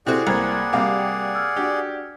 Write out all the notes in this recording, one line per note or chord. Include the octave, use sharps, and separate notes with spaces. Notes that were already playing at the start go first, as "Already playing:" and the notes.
C3 C4 E4 F#4 G#4 A4 D5 F#5
C2 A#3 C5 A#5 G#6
C3 G3 A#3 F5 D6
G5
E6 F6 G#6
D4 F#4 G4